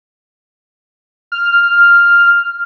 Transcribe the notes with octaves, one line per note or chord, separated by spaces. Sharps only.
F6